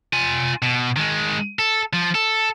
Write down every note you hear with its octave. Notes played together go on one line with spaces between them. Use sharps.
F4 G#5
B2
D#3 G#3
A4
F3
A4